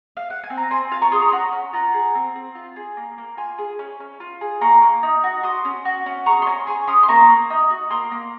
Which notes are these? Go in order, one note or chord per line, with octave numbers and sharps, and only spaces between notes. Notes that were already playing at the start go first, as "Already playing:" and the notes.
F5
F#5
G#5
C4
A#5
C4 G#5 C6
F4 F5 G#5
A#5 C#6
G#4 C6 D#6
A#5 C#6
C6
C#4 F#5 A#5
C#4
F4 F#5 A#5
G#4
C4
C4
F4
G#4
A#3
A#3
F4 G#5 C6
G#4
C#4
C#4
F4
G#4
A#3 A#5 C#6
A#3
D#4
F#4
F#4 C6 D#6
C#4
F#4
C#4
G#4 A#5 C#6
C6
C#4 A#5 C#6
G#4 G#5 C6
C#4 C6 D#6
C6
A#3 A#5 C#6
A#3
D#4
F#4
A#3 C6 D#6
A#3